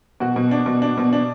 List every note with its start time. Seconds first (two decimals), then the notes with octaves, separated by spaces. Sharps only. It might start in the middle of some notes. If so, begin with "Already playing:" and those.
0.20 B2 F#4
0.36 B2
0.51 D4
0.66 B2
0.82 D4
0.98 B2
1.13 D4